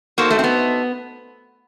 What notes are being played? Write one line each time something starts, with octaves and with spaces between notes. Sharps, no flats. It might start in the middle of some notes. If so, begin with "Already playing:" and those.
A#3 D#4 F#4 A4 C5
A3
C4
B3